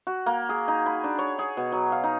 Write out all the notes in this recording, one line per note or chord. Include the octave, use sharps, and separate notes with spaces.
F#4
A#3
G#4
D#4
B5
D4
C#5
G#4
B2
F#3
F5
D#4